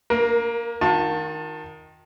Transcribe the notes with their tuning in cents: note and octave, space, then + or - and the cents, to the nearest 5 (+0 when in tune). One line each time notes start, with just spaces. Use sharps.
A#3 +0 A#4 +30
D#3 +0 F4 +45 A5 +15